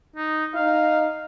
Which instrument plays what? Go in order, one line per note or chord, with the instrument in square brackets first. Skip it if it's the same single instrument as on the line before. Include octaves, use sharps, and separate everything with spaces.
[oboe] D#4
[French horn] D#4 [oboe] F5